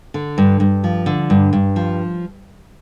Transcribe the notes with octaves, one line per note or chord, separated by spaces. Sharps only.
D3
G2
G2
F3
D3
G2
G2
F3